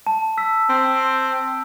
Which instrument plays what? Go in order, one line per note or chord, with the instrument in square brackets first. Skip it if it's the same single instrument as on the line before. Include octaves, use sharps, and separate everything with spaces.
[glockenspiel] A5
E6 B6
[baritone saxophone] C4